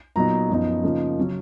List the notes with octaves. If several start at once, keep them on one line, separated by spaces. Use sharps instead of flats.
A#2 F#3 B3 D#4 A#5
F#2 F3 B3 D#4
C#3 F3 A#3 D#4
C#3 F#3 C#4